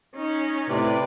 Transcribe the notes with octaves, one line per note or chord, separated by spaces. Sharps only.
C#4 D#4
A2 C3 B4 D5